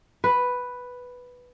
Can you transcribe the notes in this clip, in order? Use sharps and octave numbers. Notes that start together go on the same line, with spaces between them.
B4